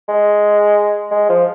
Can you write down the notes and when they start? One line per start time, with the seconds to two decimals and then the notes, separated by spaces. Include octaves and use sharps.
0.08 G#3
1.11 G#3
1.29 F3